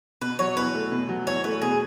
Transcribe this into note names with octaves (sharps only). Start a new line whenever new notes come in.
B2 B4
F#3 C#5
E2 B4
A3
B2
F#3
E2 C#5
A3 B4
B2 G#4